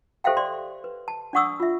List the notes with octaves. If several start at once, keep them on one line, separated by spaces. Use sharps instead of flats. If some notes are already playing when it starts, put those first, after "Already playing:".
G4 A4 C5 E5 F5 G5
D5 C6
B4
A5
D4 D5 F#5 C#6 D#6 E6
F4 E5